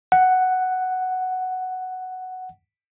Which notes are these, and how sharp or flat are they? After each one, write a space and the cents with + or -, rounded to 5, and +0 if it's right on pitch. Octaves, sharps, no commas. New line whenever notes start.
F#5 +5